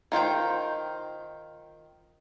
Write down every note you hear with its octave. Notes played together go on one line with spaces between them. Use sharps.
D#3 F4 C5 G5